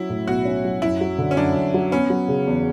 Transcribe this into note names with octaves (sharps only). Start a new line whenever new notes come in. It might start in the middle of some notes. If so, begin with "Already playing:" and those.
Already playing: F#3 C#4 E4
A2
B1 F#4
C#4
F#3
F#2 E4
F#3
D3
C#4
F#2 D4
F#2
F#3
B3 C#4
F#3
C#3
E2